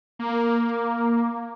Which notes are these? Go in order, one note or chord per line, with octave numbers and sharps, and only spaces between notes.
A#3